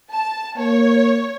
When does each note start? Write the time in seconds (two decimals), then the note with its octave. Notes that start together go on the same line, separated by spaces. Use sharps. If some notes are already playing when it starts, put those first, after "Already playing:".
0.11 A5
0.57 A#3 C#5